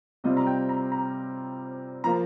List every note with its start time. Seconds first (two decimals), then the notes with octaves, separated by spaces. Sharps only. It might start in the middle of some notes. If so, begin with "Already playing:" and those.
0.24 C3 G3 C4 F4 D#5
0.37 A#5
0.47 G5
0.69 A#5
0.92 A#5
2.04 F3 A#3 F4 A#5